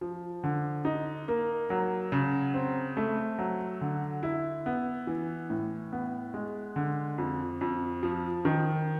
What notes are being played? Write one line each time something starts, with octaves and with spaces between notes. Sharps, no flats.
F3
D3
D#4
A#3
F#3
C#3
C4
A3
F#3
D3
E4
B3
E3
A2
B3
G#3
D3
F2
F2
F3
D#3